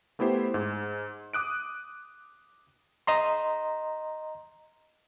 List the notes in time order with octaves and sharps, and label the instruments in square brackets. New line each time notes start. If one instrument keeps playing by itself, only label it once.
[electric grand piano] A3 B3 E4 G4 C5
G#2
D6 D#6 F#6 D7
[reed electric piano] D#5 A#5 C6